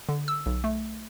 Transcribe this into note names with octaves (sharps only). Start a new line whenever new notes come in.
D3
E6
B1
A3